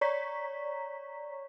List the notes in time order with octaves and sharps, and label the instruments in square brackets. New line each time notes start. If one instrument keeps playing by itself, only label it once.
[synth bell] C#5 D5 A#5 C#6 B6